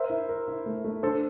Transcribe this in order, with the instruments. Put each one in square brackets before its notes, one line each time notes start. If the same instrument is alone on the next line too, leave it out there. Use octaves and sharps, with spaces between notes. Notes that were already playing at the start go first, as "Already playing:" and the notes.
Already playing: [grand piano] A#4 [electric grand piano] C5 E5
[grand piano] E4
A#4
E4
A3
A3
[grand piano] D4 [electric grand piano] A4 C5